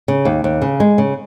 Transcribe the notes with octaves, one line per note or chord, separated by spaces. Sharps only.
C#3
D#2
D#2
C#3
G#3
C#3